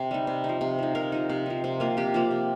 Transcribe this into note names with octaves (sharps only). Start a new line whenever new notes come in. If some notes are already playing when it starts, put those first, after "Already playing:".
Already playing: C3 G4
G3 D#4
C3
D#4
F3
C3
F3 D#4
C3 A#4
F3 D#4
C3
F3 D#4
C3
F3 A#3 F4
C3 G4
F3 A#3 F4
C3